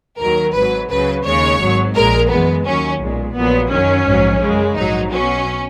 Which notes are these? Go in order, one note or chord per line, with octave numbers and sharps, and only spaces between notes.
D#2 D#3 F#3 A#4
G#1 G#2 F#3 B4
C#2 C#3 F#3 B4
D#2 C#3 G#3 C#5
G#1 G#2 F#3
A#1 A#2 G#3 A#4
F#2 E3 G#3 B3
D#2 D#3 F#3 C#4
B1 A#2 G#3
A#1 A#2 F#3 B3
F#2 D#3 F#3 C#4
A#1 G#2 F#3
F#2 C#3 G#3
A#1 G#2 F#3 D#4
B1 B2 F#3 C#4